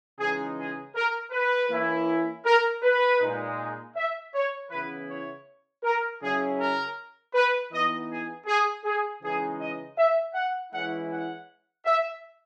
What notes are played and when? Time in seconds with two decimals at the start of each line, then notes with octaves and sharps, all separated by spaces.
0.18 C#3 E3 G#3 D#4 G#4
0.57 G#4
0.94 A#4
1.31 B4
1.70 E3 A#3 C#4 E4
2.44 A#4
2.83 B4
3.20 A#2 G#3 D#4
3.96 E5
4.34 C#5
4.70 C#3 E3 B3 E4 B4
5.08 C#5
5.83 A#4
6.21 C#3 F#3 C#4 E4 G#4
6.59 A#4
7.33 B4
7.71 E3 B3 D#4 D#5
8.09 G#4
8.47 G#4
8.84 G#4
9.22 C#3 E3 G#3 D#4 G#4
9.59 D#5
9.97 E5
10.34 F#5
10.73 E3 G#3 C#4 E4 F#5
11.11 F#5
11.85 E5